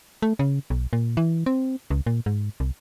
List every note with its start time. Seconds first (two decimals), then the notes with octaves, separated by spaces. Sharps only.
0.22 A3
0.39 C#3
0.70 B1
0.93 A#2
1.17 E3
1.46 C4
1.91 C#2
2.06 A#2
2.26 G#2
2.60 C2